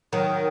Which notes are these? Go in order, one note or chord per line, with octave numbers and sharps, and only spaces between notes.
D#3 F#3